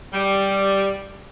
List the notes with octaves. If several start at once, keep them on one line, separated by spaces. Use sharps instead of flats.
G3